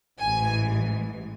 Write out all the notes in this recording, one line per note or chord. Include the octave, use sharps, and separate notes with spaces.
A1 G#2 E3 G#5